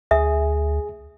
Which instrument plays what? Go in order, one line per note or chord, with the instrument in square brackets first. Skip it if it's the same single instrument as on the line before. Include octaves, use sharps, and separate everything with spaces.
[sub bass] D2 [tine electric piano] G#4 [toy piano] E5